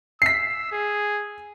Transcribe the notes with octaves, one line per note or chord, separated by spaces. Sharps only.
E6 B6 C7
G#4